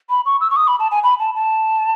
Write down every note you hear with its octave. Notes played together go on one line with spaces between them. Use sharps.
B5
C#6
E6
C#6
D#6
B5
A5
G#5
B5
A5
A5